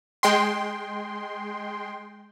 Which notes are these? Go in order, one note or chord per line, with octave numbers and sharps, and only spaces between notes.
G#3 G5 C6